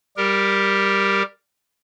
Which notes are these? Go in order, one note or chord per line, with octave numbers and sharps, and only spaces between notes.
G3 G4 A#4